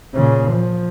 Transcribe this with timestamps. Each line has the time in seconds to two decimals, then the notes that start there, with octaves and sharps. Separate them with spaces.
0.15 A#2 C#3
0.51 F3